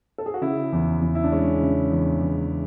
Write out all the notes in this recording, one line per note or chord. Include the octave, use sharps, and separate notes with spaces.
A4
G#4
F#4
C#3 E4
E2
E2
E4
D4
G#3 C#4
C#3
E2
E2